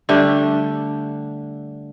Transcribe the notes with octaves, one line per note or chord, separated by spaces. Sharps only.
D3 G3 A3 D4